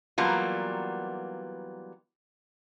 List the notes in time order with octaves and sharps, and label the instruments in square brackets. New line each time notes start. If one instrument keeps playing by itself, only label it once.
[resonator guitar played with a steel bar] E3 F#3 G3 A#3 B3 F4